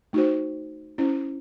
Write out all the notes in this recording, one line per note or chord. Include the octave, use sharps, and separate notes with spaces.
A3 D#4 F#4 C5
C#4 E4 C5